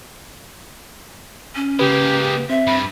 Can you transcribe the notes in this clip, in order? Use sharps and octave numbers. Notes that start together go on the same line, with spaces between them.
C#4
C#3 G#3 A#3 G4 B4
C4 E5
G2 B5